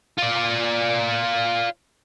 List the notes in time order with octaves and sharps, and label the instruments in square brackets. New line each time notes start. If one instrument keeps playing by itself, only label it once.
[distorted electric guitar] F4 D5